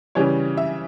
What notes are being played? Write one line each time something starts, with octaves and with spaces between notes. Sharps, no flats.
C#3 E3 G3 C#5
E5